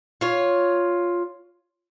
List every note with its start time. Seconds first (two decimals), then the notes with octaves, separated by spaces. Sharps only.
0.21 F4 C#5